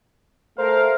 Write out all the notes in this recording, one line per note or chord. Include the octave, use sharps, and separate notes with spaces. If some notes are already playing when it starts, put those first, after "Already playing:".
A3 A#4 C5 F5